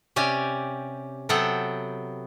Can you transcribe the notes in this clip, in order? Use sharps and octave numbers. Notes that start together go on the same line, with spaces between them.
C3 C#4 G4 D5 G#5
C3 F#3 B3 A4 F#5 G5